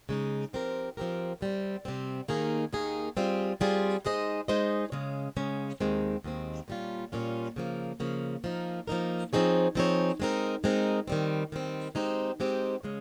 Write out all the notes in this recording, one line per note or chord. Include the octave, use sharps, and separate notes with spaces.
C#3 G#3 D#4
F3 C4 G4 A#4
F3 C4 G4 A#4
C3 G3 C4
C3 G3 C4
D#2 D#3 A#3 D#4 G#4
D#2 D#3 A#3 D#4 G#4
G3 C4 F4 G#4
G3 C4 F4 G#4
G#3 D#4 G#4 C5 D#5
G#3 D#4 G#4 C5 D#5
C#3 G#3 C#4
C#3 G#3 C#4
D#2 D#3 G#3 C4
D#2 D#3 G#3 C4
A#2 G3 C#4 F4
A#2 G3 C#4 F4
C#3 F3 A#3
C#3 F3 A#3
F3 A#3 D#4 A#4
F3 A#3 D#4 A#4
F3 C4 D#4 G#4 C#5
F3 C4 D#4 G#4 C#5
G#3 C4 D#4 A#4
G#3 C4 D#4 A#4
D#3 G3 C4
D#3 G3 C4
G#3 C4 D#4 G4 C5
G#3 C4 D#4 G4 C5
C#3 G#3 C#4